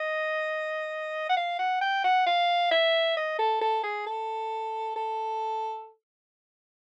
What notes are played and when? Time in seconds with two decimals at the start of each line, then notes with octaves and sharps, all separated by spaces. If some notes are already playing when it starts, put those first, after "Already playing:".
Already playing: D#5
1.29 F#5
1.37 F5
1.59 F#5
1.81 G5
2.04 F#5
2.26 F5
2.71 E5
3.17 D#5
3.39 A4
3.61 A4
3.83 G#4
4.07 A4
4.96 A4